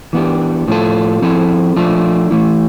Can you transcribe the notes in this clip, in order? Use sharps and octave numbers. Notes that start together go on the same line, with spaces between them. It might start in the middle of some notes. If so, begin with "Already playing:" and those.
E3 B3 D4 G4
A2 F3 C4 F4 A4
F3 C4 E4 A4
F3 A3 D4 F4
E3 A3 E4